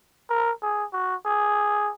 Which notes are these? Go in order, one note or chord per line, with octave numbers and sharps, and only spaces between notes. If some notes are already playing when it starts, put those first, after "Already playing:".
A#4
G#4
F#4
G#4